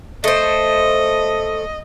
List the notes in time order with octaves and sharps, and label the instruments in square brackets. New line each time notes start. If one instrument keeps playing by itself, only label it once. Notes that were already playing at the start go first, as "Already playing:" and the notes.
[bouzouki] A3 C5 [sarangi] D#5